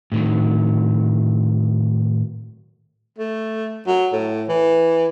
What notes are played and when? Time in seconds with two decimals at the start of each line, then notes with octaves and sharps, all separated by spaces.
0.12 A2 D#3 F#3
3.18 A3
3.87 F#3
4.13 A2
4.49 E3